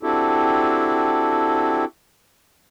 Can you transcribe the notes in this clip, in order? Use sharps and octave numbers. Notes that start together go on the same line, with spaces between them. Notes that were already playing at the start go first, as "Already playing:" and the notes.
C4 D4 E4 F#4 G4 A4